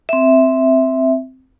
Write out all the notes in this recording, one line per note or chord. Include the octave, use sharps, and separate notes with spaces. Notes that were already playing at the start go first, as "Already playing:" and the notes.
C4 E5